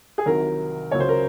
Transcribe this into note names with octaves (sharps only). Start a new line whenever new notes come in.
G#4
C2 C3 D#3 F#3 A#4
C#2 C#3 F#3 C#5
C5
A#4